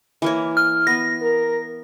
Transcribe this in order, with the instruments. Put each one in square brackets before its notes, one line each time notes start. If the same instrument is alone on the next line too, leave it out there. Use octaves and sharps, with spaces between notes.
[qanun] E3 A#3 C#5
[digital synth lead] F6
[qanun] B3 [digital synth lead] A#6
[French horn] A#4